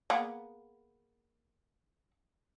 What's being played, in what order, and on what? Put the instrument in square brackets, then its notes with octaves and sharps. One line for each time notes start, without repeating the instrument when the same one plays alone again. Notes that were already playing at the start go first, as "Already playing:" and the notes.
[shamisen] A#3 B3 G#4